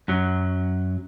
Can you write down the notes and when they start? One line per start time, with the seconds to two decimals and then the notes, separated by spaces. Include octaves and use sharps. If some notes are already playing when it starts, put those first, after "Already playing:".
0.08 F#2 F#3